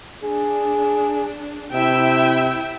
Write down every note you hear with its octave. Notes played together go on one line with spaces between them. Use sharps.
D4 G#4
C3 E4 E5 G5